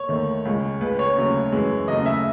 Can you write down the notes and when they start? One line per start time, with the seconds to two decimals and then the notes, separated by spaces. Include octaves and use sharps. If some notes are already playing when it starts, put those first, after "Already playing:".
Already playing: C#5
0.09 D#2 D#3 A3
0.45 C#2 C#3 G#3
0.81 C#2 C#3 G#3 B4
0.99 C#5
1.16 D#2 C#3 F#3 A3
1.52 F#2 E3 G#3
1.88 D#2 C#3 F#3 A3 D#5
2.06 E5